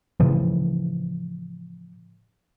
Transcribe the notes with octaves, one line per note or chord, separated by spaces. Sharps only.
A2 C#3 E3 F3